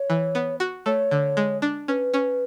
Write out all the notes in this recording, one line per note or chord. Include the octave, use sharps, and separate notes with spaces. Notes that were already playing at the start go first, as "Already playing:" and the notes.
Already playing: C#5
E3
B3
F#4
A3 C#5
D3
G#3
D4
C#4 B4
C#4